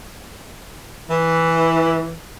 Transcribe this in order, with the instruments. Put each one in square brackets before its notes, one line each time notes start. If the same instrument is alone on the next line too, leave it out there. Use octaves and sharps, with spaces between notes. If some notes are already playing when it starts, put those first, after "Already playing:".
[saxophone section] E3